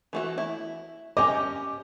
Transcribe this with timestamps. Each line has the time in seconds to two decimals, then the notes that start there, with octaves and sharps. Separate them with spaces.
0.13 E3 A3 F#4
0.38 E4
1.17 C#4 G4 D#5 D6